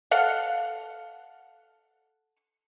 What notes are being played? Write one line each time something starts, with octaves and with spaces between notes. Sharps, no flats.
A4 F5 F#5